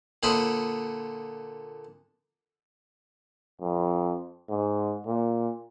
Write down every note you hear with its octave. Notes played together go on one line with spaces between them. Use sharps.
A#2 D3 C5 D#5 B5
F2
G#2
A#2